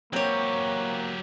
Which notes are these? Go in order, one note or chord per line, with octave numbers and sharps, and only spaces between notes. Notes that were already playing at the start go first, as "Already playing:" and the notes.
F#3 A#3 C4 G4 C#5